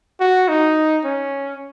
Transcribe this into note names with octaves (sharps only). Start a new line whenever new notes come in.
F#4
D#4
C#4